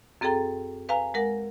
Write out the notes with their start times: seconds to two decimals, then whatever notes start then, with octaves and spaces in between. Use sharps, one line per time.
0.21 F#2 C4 G#4 A4 G5 A#5
0.89 B4 F5 G#5 A#5
1.14 G#3 A#4 F#5